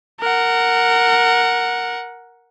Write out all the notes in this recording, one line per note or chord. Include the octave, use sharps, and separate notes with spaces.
A#4 F#5